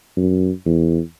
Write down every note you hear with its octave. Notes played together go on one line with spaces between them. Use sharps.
F#2
E2